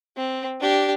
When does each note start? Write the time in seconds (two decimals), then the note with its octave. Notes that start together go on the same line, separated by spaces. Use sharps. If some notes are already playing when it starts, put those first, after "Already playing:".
0.17 C4
0.60 D4 G4